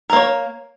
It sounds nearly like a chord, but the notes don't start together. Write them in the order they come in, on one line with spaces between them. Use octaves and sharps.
A#4 A#3 C#5